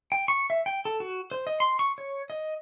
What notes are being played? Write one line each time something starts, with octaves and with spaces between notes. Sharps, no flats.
G5
C#6
E5
G5
A4
F#4
C5
D#5
C6
C#6
C#5
D#5